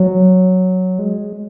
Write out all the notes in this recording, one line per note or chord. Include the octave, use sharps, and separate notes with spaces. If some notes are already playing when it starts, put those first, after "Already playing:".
Already playing: F#3
G#3